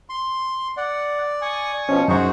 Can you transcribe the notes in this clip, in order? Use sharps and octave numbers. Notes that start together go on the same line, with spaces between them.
C6
D5 F#5
G#5 C#6 D#6
B2 F3 C#4
F#2 D#4 F#4 G#4 C5 C#6